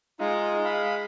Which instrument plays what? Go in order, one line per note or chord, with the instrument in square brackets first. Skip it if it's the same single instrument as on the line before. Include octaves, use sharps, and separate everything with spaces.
[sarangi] G#3 [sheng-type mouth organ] D#4 F4
[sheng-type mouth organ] F5 B5